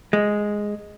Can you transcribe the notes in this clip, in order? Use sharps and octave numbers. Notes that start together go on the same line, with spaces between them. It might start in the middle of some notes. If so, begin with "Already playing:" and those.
G#3